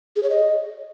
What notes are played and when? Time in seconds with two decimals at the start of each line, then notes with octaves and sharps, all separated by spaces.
0.16 G#4
0.23 C#5
0.30 D#5